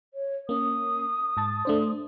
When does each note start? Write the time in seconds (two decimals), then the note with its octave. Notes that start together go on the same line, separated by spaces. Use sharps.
0.14 C#5
0.49 A#3 C#4 D#6
1.37 G#2 A5 A6
1.65 A3 D4 C5